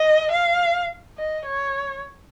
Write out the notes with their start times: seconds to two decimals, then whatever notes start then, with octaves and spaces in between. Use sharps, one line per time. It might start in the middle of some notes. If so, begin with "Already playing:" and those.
Already playing: D#5
0.31 F5
1.18 D#5
1.46 C#5